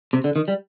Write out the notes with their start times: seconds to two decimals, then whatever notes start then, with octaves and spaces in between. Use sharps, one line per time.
0.13 C3
0.24 D3
0.36 D#3
0.48 G3